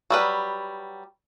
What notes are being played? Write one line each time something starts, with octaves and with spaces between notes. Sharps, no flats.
F#3 G3 B4